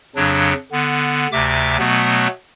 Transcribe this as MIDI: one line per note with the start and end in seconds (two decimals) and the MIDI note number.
0.16 0.53 41
0.16 0.53 49
0.16 0.53 54
0.16 0.53 62
0.72 1.27 50
0.72 1.27 59
1.32 1.77 38
1.32 1.77 48
1.32 1.77 76
1.32 1.77 86
1.78 2.27 47
1.78 2.27 54
1.78 2.27 57
1.78 2.27 59